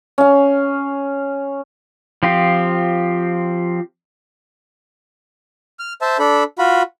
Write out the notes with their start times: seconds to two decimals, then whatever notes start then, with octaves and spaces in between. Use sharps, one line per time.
0.18 C#4 F5
2.23 F3 C4 F4 G4
5.79 F6
6.01 C5 E5 A5
6.19 D4 A4 B5
6.58 F4 F#4 B5